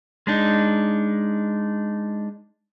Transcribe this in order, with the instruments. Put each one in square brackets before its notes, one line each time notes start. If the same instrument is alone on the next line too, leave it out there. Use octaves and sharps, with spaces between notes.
[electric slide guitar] G#3 D4 D#4